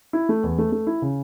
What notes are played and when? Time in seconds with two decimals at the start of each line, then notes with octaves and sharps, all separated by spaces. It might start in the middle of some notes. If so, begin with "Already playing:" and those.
0.13 E4
0.29 A3
0.43 E2
0.58 A3
0.72 A3
0.87 E4
1.02 C#3